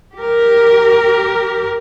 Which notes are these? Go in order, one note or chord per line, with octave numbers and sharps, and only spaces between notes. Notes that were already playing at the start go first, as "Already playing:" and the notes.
G4 A#4